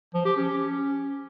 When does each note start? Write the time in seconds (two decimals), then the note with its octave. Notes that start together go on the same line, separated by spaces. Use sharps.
0.14 F3
0.25 G4
0.37 C#4